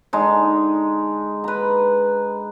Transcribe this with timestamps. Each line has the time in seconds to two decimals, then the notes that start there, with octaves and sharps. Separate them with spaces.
0.13 D3 G#3 D#4
1.44 B4 A#5